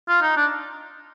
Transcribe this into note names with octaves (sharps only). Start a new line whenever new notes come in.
F4
D#4
D4